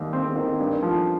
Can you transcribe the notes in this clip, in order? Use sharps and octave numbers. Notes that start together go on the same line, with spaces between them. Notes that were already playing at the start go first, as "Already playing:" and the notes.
Already playing: D#2 G3
C4
D#3
G2
F3